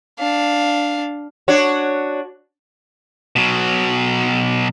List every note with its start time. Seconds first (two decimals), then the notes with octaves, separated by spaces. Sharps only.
0.19 D4 F5
1.48 D4 F#4 C#5
3.36 B2 F#3